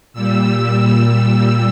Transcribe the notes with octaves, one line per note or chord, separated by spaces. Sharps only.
A#2 G3 E6